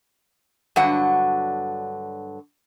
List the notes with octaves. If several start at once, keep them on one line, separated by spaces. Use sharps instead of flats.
G2 D3 F#3 F#4 F#5